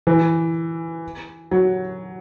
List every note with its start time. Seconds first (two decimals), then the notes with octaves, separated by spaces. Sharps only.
0.07 E3
1.51 F#3